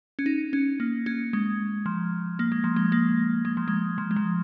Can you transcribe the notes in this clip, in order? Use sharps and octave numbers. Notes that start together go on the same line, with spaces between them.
C#4
D#4
C#4
A#3
C#4
G#3
F3
A#3
G#3
F3
G#3
A#3
G#3
F3
G#3
F3
G#3
F3